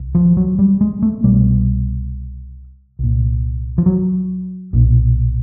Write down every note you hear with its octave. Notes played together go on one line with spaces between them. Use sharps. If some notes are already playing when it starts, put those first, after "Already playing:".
Already playing: C2
F3
F#3
G3
G#3
A3
C2 B2 G3
C2 A#2
F3
F#3
B1 A#2